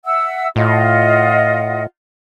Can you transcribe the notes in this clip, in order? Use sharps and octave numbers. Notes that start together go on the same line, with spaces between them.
E5 F#5 E6
A2 F4 D#5 F#5